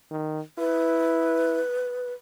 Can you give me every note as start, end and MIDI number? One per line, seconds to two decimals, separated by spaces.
0.11 0.41 51
0.58 1.61 64
0.58 2.13 71